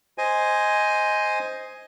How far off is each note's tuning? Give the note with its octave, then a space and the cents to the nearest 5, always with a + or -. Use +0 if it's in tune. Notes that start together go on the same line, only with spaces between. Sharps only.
C5 +0 D#5 +5 G#5 +0